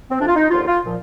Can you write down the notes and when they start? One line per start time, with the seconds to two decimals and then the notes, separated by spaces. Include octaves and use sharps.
0.10 C4
0.20 F2 C3 F3 D4
0.28 F4
0.36 D#4
0.51 D#2 D3 F3 F4
0.67 F4
0.85 A#2 F3